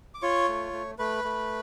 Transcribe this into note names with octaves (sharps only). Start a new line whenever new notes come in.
D6
F4 C#5 C#6
A3
A3
A3 B4 B5
A3